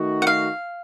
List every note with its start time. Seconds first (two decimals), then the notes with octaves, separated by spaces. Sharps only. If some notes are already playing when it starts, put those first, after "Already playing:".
Already playing: D#3 A3 D#4 F#4
0.22 F#5
0.27 F5